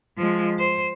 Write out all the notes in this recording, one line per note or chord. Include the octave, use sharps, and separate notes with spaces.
F3 G#3
C5